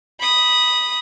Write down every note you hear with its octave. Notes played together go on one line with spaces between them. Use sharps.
B5 D#6